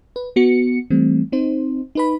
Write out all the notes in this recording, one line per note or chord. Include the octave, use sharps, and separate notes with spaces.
B4
B3 F#4 C#7
E3 G3 A3 C4
C4 D#4 C5
D#4 B4 B5